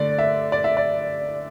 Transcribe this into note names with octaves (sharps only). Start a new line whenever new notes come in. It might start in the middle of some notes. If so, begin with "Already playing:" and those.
Already playing: D3 A3 D5
E5
D5
E5
D5